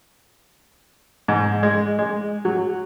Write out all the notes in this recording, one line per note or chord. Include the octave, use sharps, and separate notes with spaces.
G#2
G#3
G#3
F#3